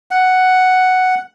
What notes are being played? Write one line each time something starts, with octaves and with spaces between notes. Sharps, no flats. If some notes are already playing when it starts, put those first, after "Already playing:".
F#5